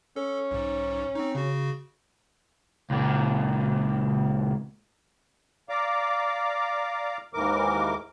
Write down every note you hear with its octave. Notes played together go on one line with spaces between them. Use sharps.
C#4 A4
B1 G#2
C4 D#4
C#3 F#4
C#2 A#2
D5 F5 A#5 D6
D#2 G#2 E3 A#4 D6